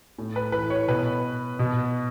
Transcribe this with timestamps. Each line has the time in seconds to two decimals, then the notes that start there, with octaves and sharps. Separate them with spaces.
0.18 A2
0.36 B4
0.52 E3 B4
0.70 C#5
0.88 B2 B4
1.59 B2